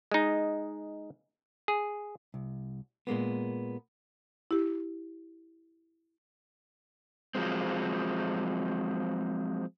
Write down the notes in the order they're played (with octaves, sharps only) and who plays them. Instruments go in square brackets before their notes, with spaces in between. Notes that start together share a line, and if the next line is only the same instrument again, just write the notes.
[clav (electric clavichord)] G#3 D#4
G#4
[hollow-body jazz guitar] C2
A#2 G#3 A#3 B3
[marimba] E4 G4
[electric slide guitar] F3 F#3 G#3 C4